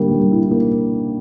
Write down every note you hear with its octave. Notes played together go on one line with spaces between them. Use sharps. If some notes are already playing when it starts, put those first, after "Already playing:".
Already playing: D3 G3 A#3
G3
E4
A#3